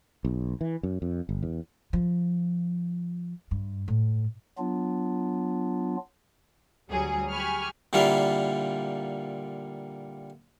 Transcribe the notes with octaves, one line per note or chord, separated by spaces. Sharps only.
B1
E3
F#2
F2
G1
E2
F3
G2
A2
F#3 B3 D4 F4
D2 F#3 G3 G#4
G4 G#4 G#5 B5 C#6 F6
A#2 D3 G3 A#3 E4 F4